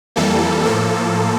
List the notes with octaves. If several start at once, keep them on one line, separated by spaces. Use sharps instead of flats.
F2 E3 G3 A#3 A4
A2 F3 A#3 A4